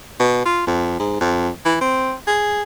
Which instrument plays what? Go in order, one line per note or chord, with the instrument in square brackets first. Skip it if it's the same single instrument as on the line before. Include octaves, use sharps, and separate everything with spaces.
[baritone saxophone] B2
F4
F2
G#2
F2
E3
C4
G#4